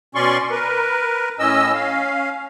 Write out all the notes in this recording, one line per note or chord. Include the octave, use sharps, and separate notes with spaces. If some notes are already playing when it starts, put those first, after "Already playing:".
B2 C#4 D5 C6 C#6
A#4 B4
A2 C#4 D#5 E6
C#4 F5